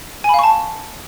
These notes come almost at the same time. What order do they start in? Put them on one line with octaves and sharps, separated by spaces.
G#5 B5 F5 C#6 A5